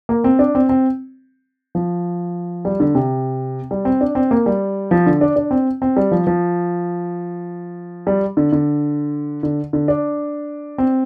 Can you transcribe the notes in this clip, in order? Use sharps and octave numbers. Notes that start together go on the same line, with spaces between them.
A#3
C4
D4
C4
C4
F3
G3
D3
C3
G3
C4
D4
C4
A#3
G3
F3
D3
D4
D4
C4
C4
G3
F3
F3
G3
D3
D3
D3
D3
D4
C4